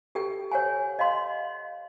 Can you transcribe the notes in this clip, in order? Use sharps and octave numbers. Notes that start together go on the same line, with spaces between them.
G4 A4 G5
C#5 F#5 G#5
D#5 F5 F#5 C6